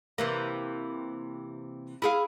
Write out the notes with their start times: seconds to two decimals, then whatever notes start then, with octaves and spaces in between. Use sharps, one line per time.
0.18 C3 E3 A#3
2.02 E4 G#4 F5